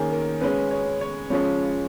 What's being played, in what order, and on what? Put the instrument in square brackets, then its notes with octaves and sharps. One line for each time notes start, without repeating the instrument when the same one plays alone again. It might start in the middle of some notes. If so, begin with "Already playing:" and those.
Already playing: [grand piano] D#3 A#3 C#4 G#4
A#4
C#3 G#3 C#4 B4
C#5
C#5
C#3 F3 G#3 C#4 C#5